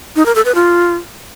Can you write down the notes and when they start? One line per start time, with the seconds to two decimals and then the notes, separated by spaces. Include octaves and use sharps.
0.16 D#4
0.26 A#4
0.35 A4
0.45 B4
0.55 F4